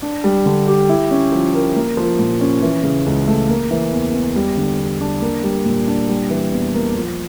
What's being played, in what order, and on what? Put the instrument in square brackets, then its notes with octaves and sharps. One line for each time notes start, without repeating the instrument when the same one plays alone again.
[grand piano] D4
G3
D3
G4
E4
C#4
F3
A#4
A#3
F3
A#2
C#4
E3
C#3
C#2
A3
A#3
E3
E2
E2
G3
D3
E2
D4
A#3
G3
A#2
D4
G3
E3
E2
A#3
F3